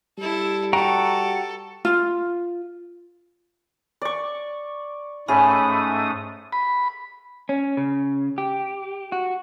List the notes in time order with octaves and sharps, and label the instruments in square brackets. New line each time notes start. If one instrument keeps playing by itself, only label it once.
[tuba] G3 [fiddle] E4 A4
[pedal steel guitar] F#4 G5 A#5 [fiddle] A4
[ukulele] F4
[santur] D5 C#6
[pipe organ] G#2 A3 D#6 [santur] C#4 G#4 [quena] B5
[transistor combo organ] B5
[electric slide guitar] C#4
C#3
G4
F#4